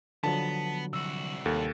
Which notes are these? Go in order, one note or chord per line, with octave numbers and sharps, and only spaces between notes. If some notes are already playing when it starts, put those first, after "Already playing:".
D3 F3 F#3 B3 A5
C2 F#4 E6
D#2 A4